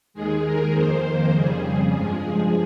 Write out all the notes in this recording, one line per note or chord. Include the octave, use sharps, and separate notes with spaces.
D#2 D#3 G#3 G#4
A#4
F2 D#3 A#3 C5
F2 C#3 G3 G#4
G#4
G2 F3 G#3
G#4